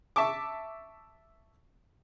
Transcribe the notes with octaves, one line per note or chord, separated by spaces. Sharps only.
E5 A5 C#6 D6